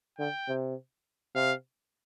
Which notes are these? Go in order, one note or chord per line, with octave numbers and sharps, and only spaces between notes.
D3 G5
C3
C3 F5